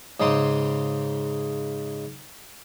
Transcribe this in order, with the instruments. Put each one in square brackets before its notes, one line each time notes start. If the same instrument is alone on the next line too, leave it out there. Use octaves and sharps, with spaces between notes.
[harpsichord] G#2 C#3 D#4 C6 D6 D#6